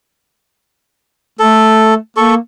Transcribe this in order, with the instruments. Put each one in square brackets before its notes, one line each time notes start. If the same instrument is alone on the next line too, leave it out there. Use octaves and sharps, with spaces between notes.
[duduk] A3 [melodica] A4
[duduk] A#3 [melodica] A4 C#6